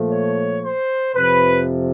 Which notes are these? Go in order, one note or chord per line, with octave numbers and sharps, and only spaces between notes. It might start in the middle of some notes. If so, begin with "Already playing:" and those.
Already playing: A#2 F3 A3
C#5
C5
F2 C3 F3 B4